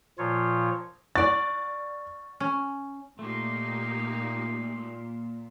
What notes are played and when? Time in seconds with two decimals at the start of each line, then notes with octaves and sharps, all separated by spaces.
0.18 A#2 F3 F4 C#5
1.16 D5 F#5 C#6 A6
2.40 C#4
3.19 A#2 A3 A#3 D#4 G4 C6